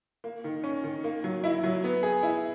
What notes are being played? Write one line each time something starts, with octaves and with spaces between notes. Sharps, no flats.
A#3
D#3
C#4
D#3
A#3
F#3
E4
F#3
B3
G#4
E4